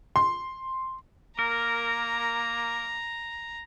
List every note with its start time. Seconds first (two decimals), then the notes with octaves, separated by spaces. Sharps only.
0.16 C6
1.39 A#3 A#4 A#5